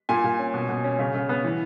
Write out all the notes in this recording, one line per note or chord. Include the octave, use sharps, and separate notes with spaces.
A#2 G#5
A#2
C#4
B2
B2
C#4
C#3
C#3
B3
E3